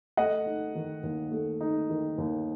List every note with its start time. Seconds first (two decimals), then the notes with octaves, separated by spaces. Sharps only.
0.17 A3 D#5 F#5
0.46 D#4
0.75 D#3
1.03 D#2
1.32 A3
1.61 D#4
1.90 D#3
2.18 D#2